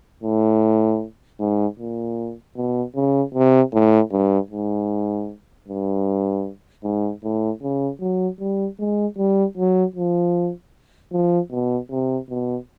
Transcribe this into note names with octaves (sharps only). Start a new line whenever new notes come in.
A2
G#2
A#2
B2
C#3
C3
A2
G2
G#2
G2
G#2
A2
C#3
F#3
G3
G#3
G3
F#3
F3
F3
B2
C3
B2